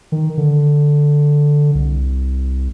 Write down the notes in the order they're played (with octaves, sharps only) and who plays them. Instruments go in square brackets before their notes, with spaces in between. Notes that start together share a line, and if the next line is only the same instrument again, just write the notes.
[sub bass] D#3
D3
C2